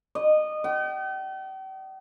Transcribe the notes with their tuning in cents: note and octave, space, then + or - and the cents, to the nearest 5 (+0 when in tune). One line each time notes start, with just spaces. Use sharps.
D#5 -20
G5 -45